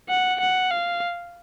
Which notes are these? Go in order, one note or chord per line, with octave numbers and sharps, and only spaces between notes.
F#5
F#5
F5